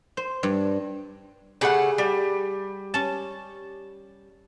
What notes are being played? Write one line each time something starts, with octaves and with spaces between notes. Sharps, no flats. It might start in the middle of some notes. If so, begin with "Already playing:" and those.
C5
G2
C#3 A3 G4 G#4 F#5 B5
G3
C#4 A5